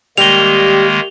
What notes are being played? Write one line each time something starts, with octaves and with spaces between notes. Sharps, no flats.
D#3 G3 G#3 A#3 F7 G7